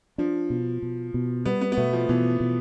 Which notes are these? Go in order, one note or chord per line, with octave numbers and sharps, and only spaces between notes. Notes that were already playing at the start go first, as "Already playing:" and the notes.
F3 D4
B2
B2
B2
G3 B3
B3
B3
B2 A3
F3
B2 E3
B2